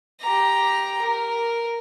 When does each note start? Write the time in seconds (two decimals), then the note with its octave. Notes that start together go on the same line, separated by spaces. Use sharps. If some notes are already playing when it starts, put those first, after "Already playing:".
0.21 G4 A#5
1.02 A#4